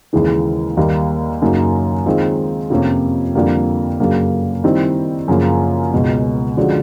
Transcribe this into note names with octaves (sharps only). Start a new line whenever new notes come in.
D#2 C#3 E3 G#3
D#2 D#3 G3 A#3
F#2 C#3 F#3 A#3 D#4
D#3 G#3 C4 F4
F2 C3 F3 A#3 C#4
F2 D3 G3 A#3 D4
F#2 C#3 F#3 A#3 D4
D#3 G3 C4 E4
F#2 C#3 F3 A#3
C#2 B2 G#3
D3 F3 G#3 C#4 F#4